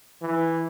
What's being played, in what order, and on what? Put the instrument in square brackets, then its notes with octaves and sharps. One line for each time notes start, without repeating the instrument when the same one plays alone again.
[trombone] E3